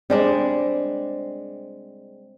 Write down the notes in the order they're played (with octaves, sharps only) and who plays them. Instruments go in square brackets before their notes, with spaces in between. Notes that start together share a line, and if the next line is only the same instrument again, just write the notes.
[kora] G3 G#3 D4 [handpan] C4